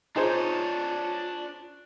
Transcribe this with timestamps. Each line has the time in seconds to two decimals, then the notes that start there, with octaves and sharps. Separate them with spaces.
0.16 D4 D#4 F4 G#4 C5 C#5